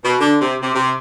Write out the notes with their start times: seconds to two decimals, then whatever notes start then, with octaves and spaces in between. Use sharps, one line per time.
0.04 B2
0.20 D3
0.41 C3
0.62 C3
0.75 C3